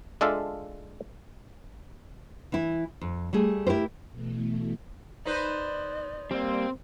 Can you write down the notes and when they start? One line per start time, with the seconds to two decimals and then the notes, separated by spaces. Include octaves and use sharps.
0.21 G#3 D4 F4 A4 E5 F5
2.52 E3 E4
3.01 F2
3.33 G3 A3 G#4
3.67 E4 G4 A#4 C5
4.13 B2 E3 A3
5.25 D#4 B4 C5 D5
6.31 G3 A#3 C4